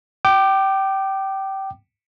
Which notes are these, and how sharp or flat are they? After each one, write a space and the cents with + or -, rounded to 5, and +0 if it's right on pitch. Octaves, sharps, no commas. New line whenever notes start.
G5 -20 D6 +20